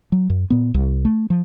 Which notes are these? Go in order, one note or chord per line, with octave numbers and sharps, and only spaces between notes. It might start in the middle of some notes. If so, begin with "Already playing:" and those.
F#3
F#2
A#2 B3
C2
A3
F3